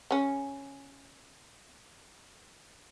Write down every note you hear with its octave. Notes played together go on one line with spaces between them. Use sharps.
C#3 C#4